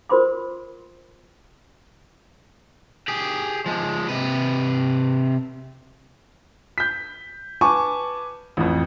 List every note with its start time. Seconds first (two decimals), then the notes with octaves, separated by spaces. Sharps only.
0.10 F4 A#4 C5 B5 C6 D6
3.08 G4 G#4
3.66 F3 G#3
4.09 C3 B4
6.78 G6 B6
7.61 B4 G#5 A5 C#6 D6
8.57 A1 F2